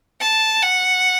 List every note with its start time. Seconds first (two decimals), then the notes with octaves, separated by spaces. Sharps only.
0.20 A5
0.63 F#5